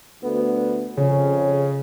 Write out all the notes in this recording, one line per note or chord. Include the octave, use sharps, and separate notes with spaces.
D2 A3 B3
F2 C#3 C#4